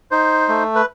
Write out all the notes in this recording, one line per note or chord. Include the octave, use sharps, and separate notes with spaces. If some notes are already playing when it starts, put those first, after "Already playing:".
D#4 C5
A3
B4